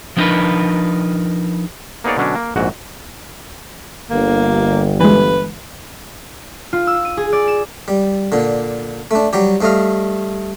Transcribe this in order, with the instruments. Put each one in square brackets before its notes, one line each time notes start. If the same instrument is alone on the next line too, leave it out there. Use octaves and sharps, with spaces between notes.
[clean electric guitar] F3 B3 D4 D#4 A#4 B4
[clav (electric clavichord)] A#3 B3 D#4 G#4 C#5 D5
B2 D3 F#3 C#4 D4
A#3
A#1 G#2 F#4
[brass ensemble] G1 [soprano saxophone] A#3
[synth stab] E3 G#3 [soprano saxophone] B4
[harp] F4
E6
D#7
G#4
D5
E7
[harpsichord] G3
A#2 D3
A3 D4
F#3 G3 G4
G2 A3 D#5 F5